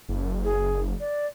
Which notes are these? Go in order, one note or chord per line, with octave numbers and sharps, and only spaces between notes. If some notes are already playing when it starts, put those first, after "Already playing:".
F#1
G#4
D5